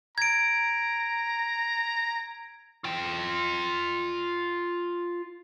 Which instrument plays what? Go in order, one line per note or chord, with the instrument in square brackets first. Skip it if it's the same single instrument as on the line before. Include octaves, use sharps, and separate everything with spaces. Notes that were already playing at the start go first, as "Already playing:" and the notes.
[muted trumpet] A#5 [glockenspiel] G#6 D7
[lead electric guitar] F4 G5